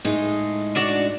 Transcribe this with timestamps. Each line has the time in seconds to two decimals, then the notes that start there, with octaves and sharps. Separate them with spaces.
0.05 A2 G#3 D#4
0.75 D4 F#4 D5